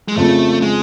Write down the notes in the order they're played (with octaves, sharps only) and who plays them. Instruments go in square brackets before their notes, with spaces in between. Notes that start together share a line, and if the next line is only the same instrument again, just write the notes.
[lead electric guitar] G#3
[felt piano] F2 C#3 F3 [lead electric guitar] A3
[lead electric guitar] G#3